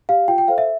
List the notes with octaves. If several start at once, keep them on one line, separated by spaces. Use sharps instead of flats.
G4 D5 F5
F4 G5
G5
A4 C5 F5
E5